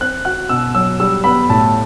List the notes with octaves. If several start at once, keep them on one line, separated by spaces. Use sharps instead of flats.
C4 F#6
F#4 F#6
B2 E6
F#3 E6
G3 E6
B3 B5
A2 A5